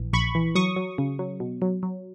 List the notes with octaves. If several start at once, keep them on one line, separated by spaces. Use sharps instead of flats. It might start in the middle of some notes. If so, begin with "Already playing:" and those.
Already playing: A#1 E3
A#1 B5 C#6
E3
F#3 C#6 D#6
F#3
C#3
F#3
B2
F#3
F#3